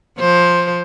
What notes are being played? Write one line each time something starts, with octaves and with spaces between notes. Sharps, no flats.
F3 C5